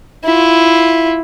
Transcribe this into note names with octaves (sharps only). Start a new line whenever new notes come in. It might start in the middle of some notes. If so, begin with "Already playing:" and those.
E4 F4